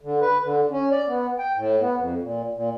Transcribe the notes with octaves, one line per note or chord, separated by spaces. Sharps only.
D3
B4
D3
C#4
D5
B3
G5
A2
B3
F2
A#2
A#2